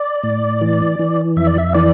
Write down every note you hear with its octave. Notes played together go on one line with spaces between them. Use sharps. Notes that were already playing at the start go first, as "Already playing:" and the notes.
Already playing: D5
A2
E3
E3
F2 E5
D5
E5
E3 D5